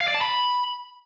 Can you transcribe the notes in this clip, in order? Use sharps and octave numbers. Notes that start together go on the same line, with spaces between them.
F5
D5
A5
B5